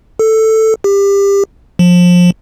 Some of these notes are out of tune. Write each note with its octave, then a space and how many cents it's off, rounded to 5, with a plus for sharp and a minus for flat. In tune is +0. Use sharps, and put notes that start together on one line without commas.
A4 +5
G4 +25
F3 +25